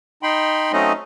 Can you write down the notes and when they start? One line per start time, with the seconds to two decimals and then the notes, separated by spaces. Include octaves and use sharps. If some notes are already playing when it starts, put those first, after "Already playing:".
0.23 D#4 G5 B5 C6
0.73 F#3 A3 C4 C#4 D#4 D#5